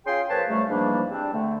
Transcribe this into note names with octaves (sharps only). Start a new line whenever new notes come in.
C#4 F4 G#4 G5 G#5 C6
A#2 F3 B4 C#5 F5 A5
C#3 F#3 G3 A3
G#2 E3 F3 G3 A#3 D4
G3 C4 D4
D3 A3